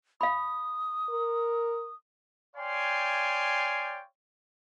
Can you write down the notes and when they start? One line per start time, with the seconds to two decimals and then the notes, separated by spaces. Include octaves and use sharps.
0.21 F5 B5 D#6
1.09 A#4
2.55 C#5 D5 F5 G5 G#5 C6